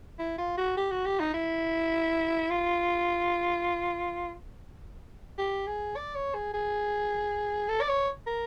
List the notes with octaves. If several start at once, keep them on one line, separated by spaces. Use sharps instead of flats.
E4
F4
F#4
G4
F#4
G4
D#4
E4
F4
G4
G#4
D5
C#5
G#4
G#4
A4
D5
C#5
A#4